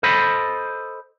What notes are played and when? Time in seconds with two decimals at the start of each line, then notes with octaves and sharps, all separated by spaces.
0.03 A4 C5 D#5 B5